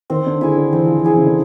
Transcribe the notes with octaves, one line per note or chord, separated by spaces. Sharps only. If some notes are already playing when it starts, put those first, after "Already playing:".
D#3 C4
D3
D3 E4 G#4
D3
E3 C4
F3
E3
E4 G#4
C#3
D3